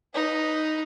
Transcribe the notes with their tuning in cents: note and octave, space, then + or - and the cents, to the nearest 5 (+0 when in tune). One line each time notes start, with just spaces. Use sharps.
D#4 +0 B4 +0